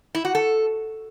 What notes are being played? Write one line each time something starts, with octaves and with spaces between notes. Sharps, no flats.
E4
F#4
A4